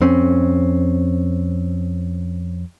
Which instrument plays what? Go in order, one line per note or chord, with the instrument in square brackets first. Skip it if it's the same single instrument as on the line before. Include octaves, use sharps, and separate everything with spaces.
[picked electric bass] F2 C4 C#4